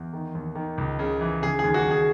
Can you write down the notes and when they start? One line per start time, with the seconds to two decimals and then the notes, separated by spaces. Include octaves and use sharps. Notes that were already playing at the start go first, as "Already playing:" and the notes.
Already playing: E2
0.13 D#3
0.35 D#2
0.55 D#3
0.78 C#2
0.99 C#3
1.21 E3
1.42 C#3 G#4
1.59 D#2 G#4
1.74 F#4
1.85 D#2
1.91 G#4